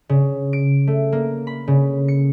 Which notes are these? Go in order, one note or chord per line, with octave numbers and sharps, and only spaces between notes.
C#3
D7
A3
A#3
B5
C#3
C#7